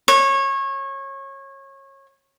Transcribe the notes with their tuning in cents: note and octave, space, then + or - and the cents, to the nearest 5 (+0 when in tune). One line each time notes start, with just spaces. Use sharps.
C#5 -25